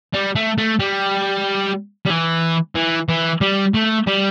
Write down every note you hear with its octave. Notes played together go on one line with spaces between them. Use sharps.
G3
A3
A3
G3
G3
E3
E3
E3
G3
A3
G3